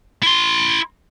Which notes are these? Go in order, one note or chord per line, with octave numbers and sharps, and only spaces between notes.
E4 C6